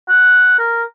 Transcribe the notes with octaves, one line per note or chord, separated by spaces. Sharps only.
F#5
A#4